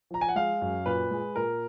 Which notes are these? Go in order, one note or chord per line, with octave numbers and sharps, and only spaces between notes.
F3 A#5
G#5
F#5
G#3 F5
F#2
A#2 B4
G#3
A#2 A#4